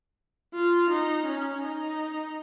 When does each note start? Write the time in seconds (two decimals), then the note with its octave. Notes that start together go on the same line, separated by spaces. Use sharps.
0.54 F4
0.91 D#4
1.26 C#4
1.63 D#4